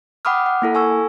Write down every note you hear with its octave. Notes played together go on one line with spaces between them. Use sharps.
F#5 G5 B5 D6 D#6 F6
F#5
A#3 E4 A4
A4 G#5 C#6 E6